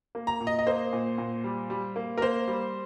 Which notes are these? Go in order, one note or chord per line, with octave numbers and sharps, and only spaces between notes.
A#3
A#5
A#2
D#5
D#5
A#3 C5
A#2
A#2
G3
G3
A#3
A#4
A#3 C5
G3